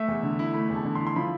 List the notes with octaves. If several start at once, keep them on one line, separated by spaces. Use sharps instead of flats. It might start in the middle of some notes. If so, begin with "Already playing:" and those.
Already playing: A3 E5
E2
D3
E4
A3 B5
E2
A5
D3
C6
E4
C6
F3 B5